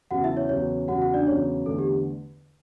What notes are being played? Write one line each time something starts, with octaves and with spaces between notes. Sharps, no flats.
E2 C#3 F#3 F#4 F#5
E4 E5
C#5
E2 C#3 F#3 C#5
E2 C#3 F#3 F#4 F#5
F#4 F#5
D4 D5
E2 C#3 F#3 C#5
E2 D3 A3 A4
G4